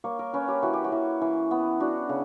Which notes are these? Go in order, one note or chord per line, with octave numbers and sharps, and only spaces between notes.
A#3 C#5
A#4
C#4 B4
G4
E3 F#4
G4
F#4
E3
E3
B3
D4 F#4
C#3